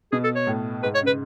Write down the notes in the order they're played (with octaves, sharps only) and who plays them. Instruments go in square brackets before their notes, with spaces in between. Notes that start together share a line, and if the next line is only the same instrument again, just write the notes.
[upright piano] B2 [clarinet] G#4
[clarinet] A4
C#5
[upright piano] A2
[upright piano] G#2 [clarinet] B4
[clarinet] C#5
[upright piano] C#3
[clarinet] B4